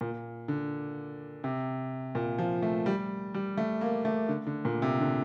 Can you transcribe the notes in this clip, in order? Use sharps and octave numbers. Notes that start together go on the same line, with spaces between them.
A#2
D3
C3
A#2
F3
A3
G3
G3
A3
A#3
A3
D3
D3
A#2
C3
D3